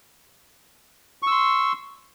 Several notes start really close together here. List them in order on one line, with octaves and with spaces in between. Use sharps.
C#6 E6 C6